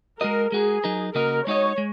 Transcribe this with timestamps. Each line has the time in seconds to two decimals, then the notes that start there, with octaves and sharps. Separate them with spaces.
0.20 G#3 F#4 A#4 D#5
0.52 G#3 F#4 G#4 A#4
0.84 F#3 D#4 A#4
1.15 C#3 A#3 F#4 A#4 D#5
1.46 G#3 D#4 F#4 C#5 D#5
1.78 G#3